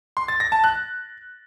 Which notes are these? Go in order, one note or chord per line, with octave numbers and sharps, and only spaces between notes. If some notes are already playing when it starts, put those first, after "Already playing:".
C6
A6
A#6
A5
F#6